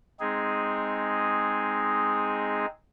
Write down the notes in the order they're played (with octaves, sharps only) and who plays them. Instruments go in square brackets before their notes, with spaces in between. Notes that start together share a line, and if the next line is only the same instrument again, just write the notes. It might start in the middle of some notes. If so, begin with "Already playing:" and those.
[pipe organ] G#3 C4 D#4 G#4